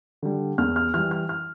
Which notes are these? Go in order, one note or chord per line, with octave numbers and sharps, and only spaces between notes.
D3 G3
E2 F6
F6
E3 G3 F6
F6
F6